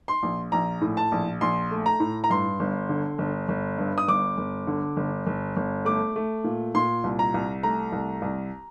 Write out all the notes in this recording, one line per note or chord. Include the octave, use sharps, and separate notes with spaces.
C6
A#1
A#1 A#5
A2
A5
A#1
A#1 C6
A3
A#5
A2
A#5
G2 C6
G1
D3
G1
G1
G2
D#6
G1 D6
G1
D3
G1
G1
G1
A3 D6
A3
A#2
A#2 C6
C2
A#5
C2
A3 A#5
C2
C2